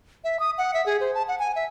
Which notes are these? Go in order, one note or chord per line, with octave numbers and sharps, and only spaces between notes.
E5
D#6
F#5
E5
G#4
C5
A5
F#5
G#5
E5